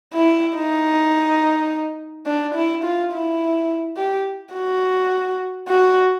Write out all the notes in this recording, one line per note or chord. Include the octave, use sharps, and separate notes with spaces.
E4
D#4
D4
E4
F4
E4
G4
F#4
F#4